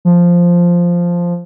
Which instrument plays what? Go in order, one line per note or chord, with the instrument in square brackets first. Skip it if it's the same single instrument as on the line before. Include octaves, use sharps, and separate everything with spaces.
[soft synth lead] F3